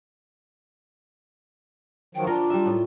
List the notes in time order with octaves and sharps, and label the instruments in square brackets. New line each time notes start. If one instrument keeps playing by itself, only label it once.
[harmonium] D#3 F3 F#3 [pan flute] G5
[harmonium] D4 [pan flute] F4 [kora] A#4
[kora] G3 E5
A2